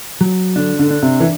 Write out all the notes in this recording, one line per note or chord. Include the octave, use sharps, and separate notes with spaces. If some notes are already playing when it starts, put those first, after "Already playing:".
F#3
D3 D4
D3
D4
C3
E3